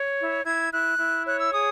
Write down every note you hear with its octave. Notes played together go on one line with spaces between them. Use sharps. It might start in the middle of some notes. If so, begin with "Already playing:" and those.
Already playing: C#5
E4
E4 G#6
E4 F#6
E4
C#5 F#6
E6
G#4 D#6